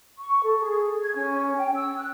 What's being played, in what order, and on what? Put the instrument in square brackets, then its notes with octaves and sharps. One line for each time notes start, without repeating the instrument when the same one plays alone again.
[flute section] C#6
A4
G#4
G#6
C#4
G5
E6
F#6